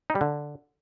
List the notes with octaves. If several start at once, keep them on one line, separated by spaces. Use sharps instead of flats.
D#4
G3
D3